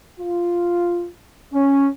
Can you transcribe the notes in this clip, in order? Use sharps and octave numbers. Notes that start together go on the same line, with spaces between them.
F4
C#4